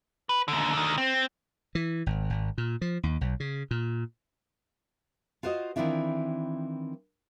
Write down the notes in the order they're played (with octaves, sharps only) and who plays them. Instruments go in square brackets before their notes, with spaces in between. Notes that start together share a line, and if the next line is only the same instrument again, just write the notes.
[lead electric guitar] B4
D#2 D3
D3 D#3
C4
[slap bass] E3
G#1
G#1
A#2
F3
D#2
B1
C#3
A#2
[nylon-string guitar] F4 F#4 C5 D5 D#5
D#3 E3 C4 D4 E4 F4